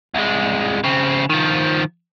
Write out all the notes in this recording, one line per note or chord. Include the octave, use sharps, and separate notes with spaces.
C2 G#3
C#3 C4
D#3 F3